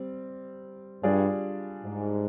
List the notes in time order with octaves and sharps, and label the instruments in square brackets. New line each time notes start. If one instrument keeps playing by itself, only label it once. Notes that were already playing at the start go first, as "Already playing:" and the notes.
Already playing: [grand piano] G3 C4
[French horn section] G2 [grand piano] G3 D4 F4 G#4
[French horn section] G#2